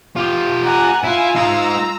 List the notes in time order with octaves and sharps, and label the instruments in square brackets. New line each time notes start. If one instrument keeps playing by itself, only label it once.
[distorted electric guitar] F4 G4
[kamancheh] F#5 G#5 [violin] A#5
[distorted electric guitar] E4 [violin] F4 [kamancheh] G#5
[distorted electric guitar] G#3 D#4 [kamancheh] A#5 E6